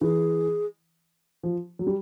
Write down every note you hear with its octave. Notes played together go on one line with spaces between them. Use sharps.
E3 G#4
F3
F#3
G3